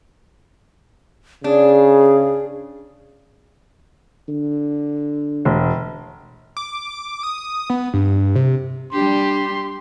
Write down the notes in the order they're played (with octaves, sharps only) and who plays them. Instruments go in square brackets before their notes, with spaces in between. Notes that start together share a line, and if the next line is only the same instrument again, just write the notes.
[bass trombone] C#3 [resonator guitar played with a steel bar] D4 [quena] G#4
[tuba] D3
[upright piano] E1
[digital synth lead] D6
D#6
B3
G2
C3
[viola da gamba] G3 G4 [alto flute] D4 [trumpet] C6